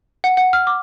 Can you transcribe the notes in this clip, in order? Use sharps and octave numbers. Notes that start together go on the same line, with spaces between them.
F#5
F#5
F6
D6